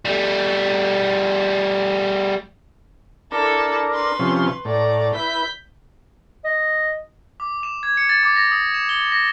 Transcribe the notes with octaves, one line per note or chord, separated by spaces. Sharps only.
G3 A3
D4 E4 A4 A#4
B4 C6
C3 F3 C#4
A2 D5 A#5
E4 B4 G6 B6
D#5
D6
E7
G#6
C#7
A6
D6
A#6
D#6
E7
G7
A#6